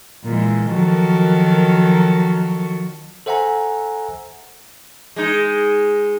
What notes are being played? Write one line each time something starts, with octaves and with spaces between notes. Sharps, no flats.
A#2 E3 G#3
D#3 F3 F#3 F#4 A4 A#4
A4 C5 E5 F#5 G#5 A#5
G#3 D#4